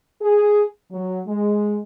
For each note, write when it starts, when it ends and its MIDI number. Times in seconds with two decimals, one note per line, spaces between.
0.21 0.64 68
0.91 1.20 54
1.27 1.79 56